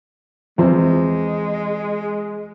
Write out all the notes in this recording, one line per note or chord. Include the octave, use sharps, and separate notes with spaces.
E2 F3 G#3 C4